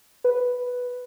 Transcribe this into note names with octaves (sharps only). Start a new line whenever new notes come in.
B4